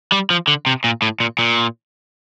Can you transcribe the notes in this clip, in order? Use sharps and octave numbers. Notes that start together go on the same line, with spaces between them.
G3
F3
D3
C3
A#2
A2
A#2
A#2